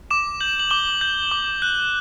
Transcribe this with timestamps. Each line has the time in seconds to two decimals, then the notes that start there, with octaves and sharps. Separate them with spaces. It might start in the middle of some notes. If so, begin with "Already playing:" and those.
0.11 D6 E7
0.40 G6 F#7
0.59 F#7
0.70 D6 G7
1.01 G6
1.32 D6
1.62 F#6